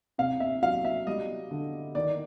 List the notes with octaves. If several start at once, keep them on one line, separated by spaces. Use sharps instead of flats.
C3 F5
E5
F#3 F5
E5
G3 D#5
D3
D#3 D5